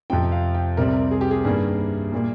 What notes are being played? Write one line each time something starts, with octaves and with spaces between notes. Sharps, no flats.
F2 C3 F3 C4 G5
F5
G5
C2 C3 G3 C4 A#4
G#4
G4
G#4
G2 D#3 G3 A#3 G#4
A#2 G3 A#3